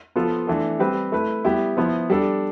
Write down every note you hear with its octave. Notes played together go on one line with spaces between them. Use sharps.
F3 B3 F4 A4
E3 A3 D4 A4
G3 C4 G4 B4
A3 E4 B4
G3 B3 E4 G4
F3 B3 E4
G3 D4 A4